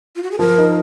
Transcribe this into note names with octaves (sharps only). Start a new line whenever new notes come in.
F4
F#4
G#4
F3 A#4
D#4